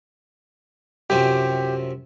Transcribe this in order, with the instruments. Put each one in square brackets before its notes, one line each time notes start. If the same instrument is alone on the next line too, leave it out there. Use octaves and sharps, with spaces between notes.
[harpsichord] F#2 C3 F3 [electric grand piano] G4